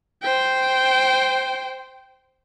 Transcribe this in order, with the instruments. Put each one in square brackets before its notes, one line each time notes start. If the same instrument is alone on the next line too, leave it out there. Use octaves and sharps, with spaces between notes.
[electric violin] C5 G5